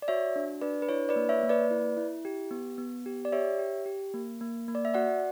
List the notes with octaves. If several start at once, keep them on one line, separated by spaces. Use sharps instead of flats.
D5
F#4 C#5 E5
D4
D4 B4 D5
B4
E4 C#5
B4 D5
A#3
C#5 E5
A#3
B4 D5
E4
E4
G4
B3
B3
G4
D5
G4 C#5 E5
G4
G4
A#3
A#3
A#3
D5
E5
F#4 D5 F#5